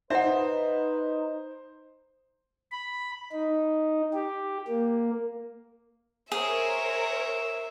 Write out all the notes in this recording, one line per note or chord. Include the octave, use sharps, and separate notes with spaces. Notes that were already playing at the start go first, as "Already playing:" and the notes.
D#4 B4 C5 E5 F#5
B5
D#4
G4
A#3
G#4 A#4 C5 C#5 E5